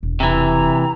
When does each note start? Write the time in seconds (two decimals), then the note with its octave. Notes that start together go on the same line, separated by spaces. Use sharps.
0.03 E1
0.20 C3 E3 A#5